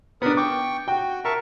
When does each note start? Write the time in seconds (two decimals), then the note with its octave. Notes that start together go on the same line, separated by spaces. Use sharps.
0.22 B3 D4 A#4 B5 D#6
0.37 G5 C#6 D6
0.88 F#4 G5
1.25 A#4 E5 A5 C#6